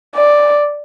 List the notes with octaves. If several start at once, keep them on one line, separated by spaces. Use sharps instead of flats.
D5